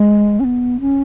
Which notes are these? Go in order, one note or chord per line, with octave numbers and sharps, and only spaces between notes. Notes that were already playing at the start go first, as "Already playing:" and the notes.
Already playing: G#3
C#4
B3
C#4